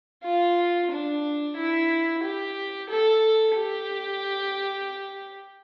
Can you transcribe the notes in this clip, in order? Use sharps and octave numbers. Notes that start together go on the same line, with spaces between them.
F4
D4
E4
G4
A4
G4